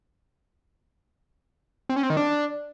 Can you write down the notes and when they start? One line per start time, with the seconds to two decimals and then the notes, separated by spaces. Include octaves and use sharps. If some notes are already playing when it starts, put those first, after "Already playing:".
1.89 C4
1.96 C#4
2.03 C4
2.10 D#3
2.17 D4